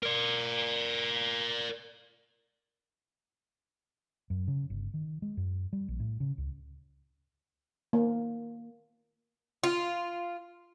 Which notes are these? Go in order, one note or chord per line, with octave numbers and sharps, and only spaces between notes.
A#4 D5
F#2
C#3
G1
D#3
G#3
F#2
G3
A#1
A2
C#3
C#2
A#3
F4